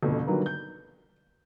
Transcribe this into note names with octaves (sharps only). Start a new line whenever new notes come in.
G1 F2 B2
D3 D#3 F#3 G3 A#3 B4
G6